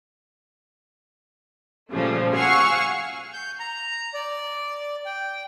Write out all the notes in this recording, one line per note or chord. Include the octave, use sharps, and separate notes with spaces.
A#2 C#3 F3 G3 A3
F5 F#5 G#5 C#6 E6 F6
G6
A#5
D5
G5